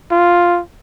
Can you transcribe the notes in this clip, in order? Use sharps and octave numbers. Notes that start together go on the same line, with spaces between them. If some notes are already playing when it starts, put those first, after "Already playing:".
F4